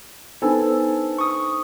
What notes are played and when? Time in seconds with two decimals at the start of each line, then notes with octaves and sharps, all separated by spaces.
0.42 B3 D4 D#4 A4 C5 G#5
1.18 C#6 D#6